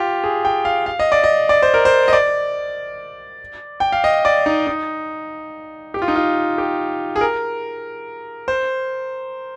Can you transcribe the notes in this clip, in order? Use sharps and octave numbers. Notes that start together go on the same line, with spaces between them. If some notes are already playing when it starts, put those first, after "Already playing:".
Already playing: F4 G4
G#4
G5
F5
F5
D#5
D5
D#5
D5
C5
A#4
C5
D#5
D5
G5
F5
D#5
D5
D#4
D#4
G4
F4
D#4
F4
G4
G#4
A#4
C5